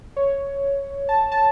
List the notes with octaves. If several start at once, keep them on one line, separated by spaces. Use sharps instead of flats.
C#5
A5
A5